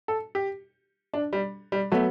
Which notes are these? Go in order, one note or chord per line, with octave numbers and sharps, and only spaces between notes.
A4
G4
D4
G3
G3
F#3 A3 B3